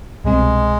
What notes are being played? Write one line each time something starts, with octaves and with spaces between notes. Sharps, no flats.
C2 B2 G3 G#3 C4